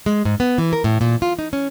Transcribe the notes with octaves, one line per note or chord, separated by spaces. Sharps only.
G#3
G#2
B3
E3
A#4
A2
A#2
F4
D#4
C#4